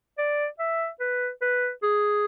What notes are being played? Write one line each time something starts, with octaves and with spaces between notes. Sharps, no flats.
D5
E5
B4
B4
G#4